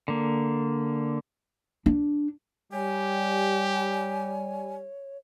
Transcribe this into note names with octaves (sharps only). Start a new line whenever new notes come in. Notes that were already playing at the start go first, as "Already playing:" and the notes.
D3 A#3
D4
G3 G4 C#5 G#5